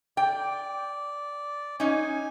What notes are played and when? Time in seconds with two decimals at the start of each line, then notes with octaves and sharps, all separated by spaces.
0.17 D5 G5
1.80 C#4 D#4 G#5